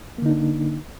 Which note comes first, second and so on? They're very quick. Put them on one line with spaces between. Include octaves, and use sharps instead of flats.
A#3 D3 D#4 D4